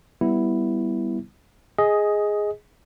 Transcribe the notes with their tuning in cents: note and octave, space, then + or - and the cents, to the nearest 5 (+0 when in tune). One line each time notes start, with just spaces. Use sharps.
G3 +5 B3 +0 E4 +0
G#4 +0 D#5 +10